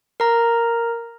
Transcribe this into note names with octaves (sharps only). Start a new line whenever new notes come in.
A#4 A#5